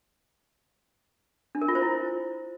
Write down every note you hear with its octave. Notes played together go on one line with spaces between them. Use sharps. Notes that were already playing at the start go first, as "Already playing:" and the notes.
D4
A#4
F4
C5
E4